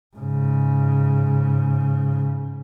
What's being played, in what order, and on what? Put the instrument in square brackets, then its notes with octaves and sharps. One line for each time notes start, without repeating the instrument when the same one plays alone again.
[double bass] G#2 C#3